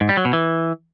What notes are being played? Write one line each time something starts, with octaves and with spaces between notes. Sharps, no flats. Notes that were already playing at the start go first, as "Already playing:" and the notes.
G#2
G3
F#3
B2
E3